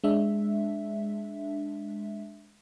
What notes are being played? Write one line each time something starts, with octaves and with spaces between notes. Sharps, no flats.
G#3 D4 E5